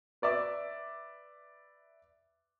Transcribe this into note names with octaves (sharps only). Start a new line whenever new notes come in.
B4 D5 E5 D6